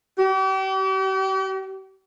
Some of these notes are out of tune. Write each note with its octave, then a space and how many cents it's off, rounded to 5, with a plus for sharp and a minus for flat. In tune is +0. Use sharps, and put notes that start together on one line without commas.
G4 -40